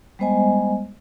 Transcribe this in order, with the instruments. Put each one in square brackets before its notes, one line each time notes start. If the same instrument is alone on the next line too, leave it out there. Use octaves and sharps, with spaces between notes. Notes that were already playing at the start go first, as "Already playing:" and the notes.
[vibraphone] G3 G#3 B3 C5 D#5 G#5